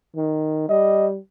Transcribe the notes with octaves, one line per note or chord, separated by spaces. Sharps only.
D#3
G3 D#5